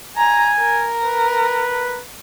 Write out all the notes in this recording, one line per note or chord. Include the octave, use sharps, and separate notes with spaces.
G#5 A#5
A#4
B4